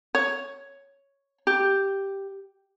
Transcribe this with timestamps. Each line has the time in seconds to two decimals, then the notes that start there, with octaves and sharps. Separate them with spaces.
0.15 C#5
1.47 G4